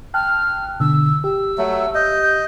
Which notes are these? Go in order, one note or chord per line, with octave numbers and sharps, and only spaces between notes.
G5 A5 F6 F#6
B2 D3 E6
G4 E6
F#3 A3
D#5 G6
G6